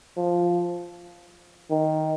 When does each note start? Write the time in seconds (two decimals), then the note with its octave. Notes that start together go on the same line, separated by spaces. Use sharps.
0.17 F3
1.70 D#3